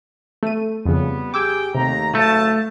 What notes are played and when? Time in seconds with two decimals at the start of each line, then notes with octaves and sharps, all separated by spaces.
0.43 A3 D#7
0.86 F2 C#3 G3 B3
1.34 G4 G#4 G5 D6 E6 G#6
1.75 D#2 C3 A3 A#5
2.15 F#1 A3 F5 A5